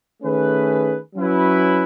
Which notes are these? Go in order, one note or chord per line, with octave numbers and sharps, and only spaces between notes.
D#3 A3 C#4 G#4 B4
F#3 C#4 E4 B4